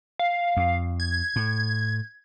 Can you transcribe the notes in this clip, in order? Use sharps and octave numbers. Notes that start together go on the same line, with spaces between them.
F5
F2
G#6
A2